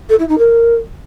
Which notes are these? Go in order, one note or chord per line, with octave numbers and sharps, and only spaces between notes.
A4
E4
D#4
A#4